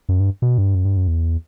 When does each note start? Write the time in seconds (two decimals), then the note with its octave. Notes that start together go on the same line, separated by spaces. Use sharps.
0.09 F#2
0.20 G2
0.42 B2
0.58 G2
0.75 F#2
0.85 G2
0.97 F#2
1.08 E2